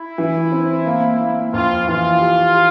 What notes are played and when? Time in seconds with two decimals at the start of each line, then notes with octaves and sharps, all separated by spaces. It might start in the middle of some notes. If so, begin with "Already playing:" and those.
Already playing: E4
0.18 E3
0.52 C4
0.87 A#3
1.20 A#3
1.53 F2 F4
1.87 E3 F4
2.21 G4
2.55 G4